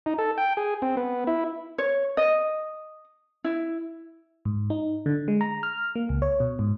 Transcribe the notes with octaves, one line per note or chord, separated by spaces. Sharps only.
D#4
A4
G5
G#4
C4
B3
E4
C#5
D#5
E4
G#2
D#4
D3
G#3
A#5
F6
A#3
C#2
C#5
B2
G#2